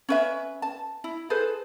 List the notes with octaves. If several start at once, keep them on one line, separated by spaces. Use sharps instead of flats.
C#4 B4 E5
A5
E4
G#4 A4 B4 C5